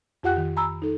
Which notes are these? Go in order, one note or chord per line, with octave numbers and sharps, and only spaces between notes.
F2 F4 G4 F#5 G5 F#6
D#3
G#5 A#5 B5 E6
D#4 A4